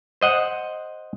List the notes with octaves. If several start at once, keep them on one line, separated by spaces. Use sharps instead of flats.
C5 D#5 F#5